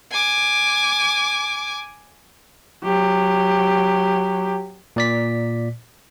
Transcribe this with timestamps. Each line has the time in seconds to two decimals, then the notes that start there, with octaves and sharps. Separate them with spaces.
0.12 G#5 D6
2.84 F#3 G4
4.96 A#2 D5 B6